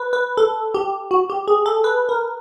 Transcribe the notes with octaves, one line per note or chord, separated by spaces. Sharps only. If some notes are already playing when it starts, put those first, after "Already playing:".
Already playing: B4
B4
A4
G4
F#4
G4
G#4
A4
B4
A#4